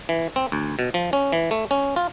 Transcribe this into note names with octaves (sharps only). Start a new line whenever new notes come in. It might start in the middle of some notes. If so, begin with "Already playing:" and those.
E3
C4
D2
B2
F3
C#4
E3
A3
C#4
F4